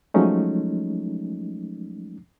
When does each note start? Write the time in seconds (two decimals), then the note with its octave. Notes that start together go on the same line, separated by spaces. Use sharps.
0.14 F3 F#3 G#3 A3 C#4 D#4